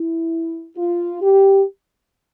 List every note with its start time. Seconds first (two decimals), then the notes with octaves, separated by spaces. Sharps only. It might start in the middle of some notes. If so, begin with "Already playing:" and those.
Already playing: E4
0.76 F4
1.21 G4